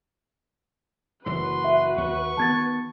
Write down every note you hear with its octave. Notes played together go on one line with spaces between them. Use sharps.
F#1 E3 F#4 B4 C6
E5
D#2 C#6
D#3 B3 A5 G#6 A6